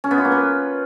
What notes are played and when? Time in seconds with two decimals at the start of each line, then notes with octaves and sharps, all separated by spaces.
0.04 C#4
0.11 B3
0.18 F4
0.25 A#3
0.32 B4